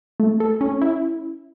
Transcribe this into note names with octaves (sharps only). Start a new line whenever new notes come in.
A3
A4
C#4
E4